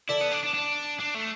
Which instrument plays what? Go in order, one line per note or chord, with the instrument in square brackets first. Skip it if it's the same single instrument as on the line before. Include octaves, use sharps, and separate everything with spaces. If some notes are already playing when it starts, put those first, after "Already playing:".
[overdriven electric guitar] E4 [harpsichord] A4 D5
[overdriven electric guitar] B3
D4
D4
D4
D4
A3